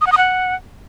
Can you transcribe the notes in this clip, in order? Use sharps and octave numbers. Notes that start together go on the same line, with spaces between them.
D#6
F#5
D#6
F#5